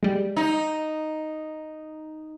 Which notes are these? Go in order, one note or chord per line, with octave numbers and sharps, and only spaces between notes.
G3 G#3
D#4